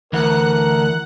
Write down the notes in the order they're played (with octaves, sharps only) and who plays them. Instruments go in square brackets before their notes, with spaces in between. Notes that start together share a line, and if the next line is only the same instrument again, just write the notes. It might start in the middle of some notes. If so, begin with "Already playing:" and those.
[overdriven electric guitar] D2 [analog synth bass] E3 [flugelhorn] A#4 [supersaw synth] F#5 F#6